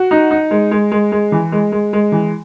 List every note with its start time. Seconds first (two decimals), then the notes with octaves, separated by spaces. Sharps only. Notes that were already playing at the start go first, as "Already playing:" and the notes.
Already playing: F#4
0.11 D#4
0.31 D#4
0.51 G#3
0.71 G#3
0.91 G#3
1.12 G#3
1.32 E3
1.52 G#3
1.72 G#3
1.93 G#3
2.12 E3